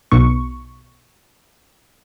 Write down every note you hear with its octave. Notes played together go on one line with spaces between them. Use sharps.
B1 B2 C#6